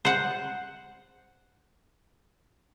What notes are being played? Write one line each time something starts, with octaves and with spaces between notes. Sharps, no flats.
C5 F#5